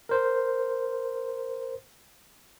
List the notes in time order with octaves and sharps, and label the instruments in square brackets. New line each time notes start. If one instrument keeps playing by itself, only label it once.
[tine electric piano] A#4 C5